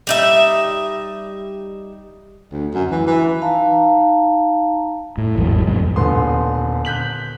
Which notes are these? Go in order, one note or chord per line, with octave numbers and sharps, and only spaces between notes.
G3 D#4 E5
D2
F#2
E3
E3
D#4 F5 A5 A#5
A2
G#1 E2 G#2 F#3
C2 F2 G#2 C3
D#1 D3 B3 C6
F#6 G6 B6 F#7